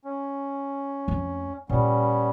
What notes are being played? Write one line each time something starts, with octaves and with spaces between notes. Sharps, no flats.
C#4
F2 A3
A#2 G3 B3 C#4